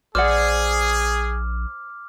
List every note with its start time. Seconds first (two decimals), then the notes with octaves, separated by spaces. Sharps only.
0.15 A#1 G#4 C5 D5 F#5 D6 F6